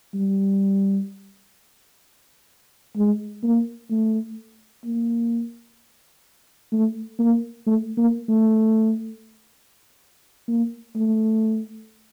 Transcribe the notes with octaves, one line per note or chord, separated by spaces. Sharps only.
G3
G#3
A#3
A3
A#3
A3
A#3
A3
A#3
A3
A#3
A3